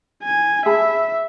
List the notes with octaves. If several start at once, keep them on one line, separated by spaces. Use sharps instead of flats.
G#5
G#4 E5 A5 B5